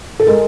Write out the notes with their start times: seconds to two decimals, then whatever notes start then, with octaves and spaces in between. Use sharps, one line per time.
0.20 A4
0.27 G#3 A#4